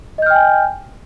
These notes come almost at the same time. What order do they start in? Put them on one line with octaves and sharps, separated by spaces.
D#5 G6 F6 G5 G#5